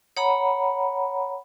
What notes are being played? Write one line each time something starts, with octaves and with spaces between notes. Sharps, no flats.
C#5 F#5 A#5 B5